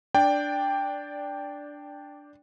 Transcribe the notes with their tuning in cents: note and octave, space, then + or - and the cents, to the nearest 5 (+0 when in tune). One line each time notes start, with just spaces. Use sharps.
D4 +0 D5 -10 G5 +10